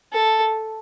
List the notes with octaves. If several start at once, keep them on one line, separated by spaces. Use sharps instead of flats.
A4